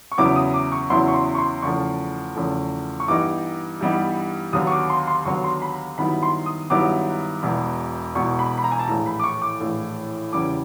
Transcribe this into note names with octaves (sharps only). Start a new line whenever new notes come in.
C#6
E2 C#3 F#3 B3 E4 D6
D#6
D6
C#6
E2 C#3 F#3 B3 E4 C6
C#6
C6
C#6
C6
E2 C#3 F3 A3 C#6
E2 C#3 F3 A3
C#6
G2 E3 G3 B3 D#4 D6
G2 E3 G3 B3 D#4
D#2 D3 F#3 B3 D#6
C#6
D6
C6
C6
D#2 D3 F#3 B3 C#6
C6
B5
G2 D#3 F#3 B3 E4 B5
C6
D#6
G2 D#3 F#3 B3 E4 D6
E1 E2 B2
E1 E2 B2 C#6
B5
B5
A#5
G#5
A5
A#1 A2 E3 A#5
B5
D6
C#6
D6
A#1 A2 E3
E2 C#3 E3 G3 D6